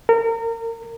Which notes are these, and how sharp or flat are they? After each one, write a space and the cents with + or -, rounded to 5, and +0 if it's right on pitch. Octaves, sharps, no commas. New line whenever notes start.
A#4 -30